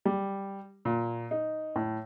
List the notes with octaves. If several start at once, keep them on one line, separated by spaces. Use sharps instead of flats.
G3
A#2
D#4
A2